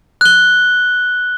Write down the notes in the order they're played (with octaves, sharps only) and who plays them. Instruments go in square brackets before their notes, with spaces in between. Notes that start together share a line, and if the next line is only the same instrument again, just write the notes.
[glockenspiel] F#6 G7